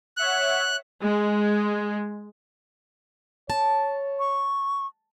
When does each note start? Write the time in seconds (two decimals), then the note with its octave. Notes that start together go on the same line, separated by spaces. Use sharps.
0.17 C#5 E5 F#5 F#6
1.02 G#3
3.50 C#5 A5
4.19 C#6